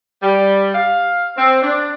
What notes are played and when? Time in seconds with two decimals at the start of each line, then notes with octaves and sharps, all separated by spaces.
0.22 G3
0.75 F5
1.36 C4
1.62 D4